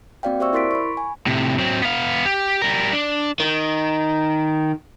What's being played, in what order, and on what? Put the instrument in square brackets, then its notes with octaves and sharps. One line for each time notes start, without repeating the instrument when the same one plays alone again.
[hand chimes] A#3 C4 F#4 D5 F5 G5
G4 C5 D5 E5 C#6 E6
E4 A#4 C6 A6 B6 D7
B5 C#6
G#5
[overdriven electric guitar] A2 C3
F#3 C4
B3 F5
G4
G3 A#4
D4
D#3